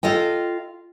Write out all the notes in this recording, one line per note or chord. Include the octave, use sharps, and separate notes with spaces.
F4 A4 D#5 G5